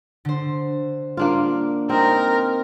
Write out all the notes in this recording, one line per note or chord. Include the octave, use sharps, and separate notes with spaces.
D3 C5
A#3 D4 F4
C4 D#4 A#4